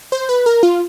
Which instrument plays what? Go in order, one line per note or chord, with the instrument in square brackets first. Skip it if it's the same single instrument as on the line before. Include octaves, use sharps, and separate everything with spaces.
[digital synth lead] C5
B4
A#4
F4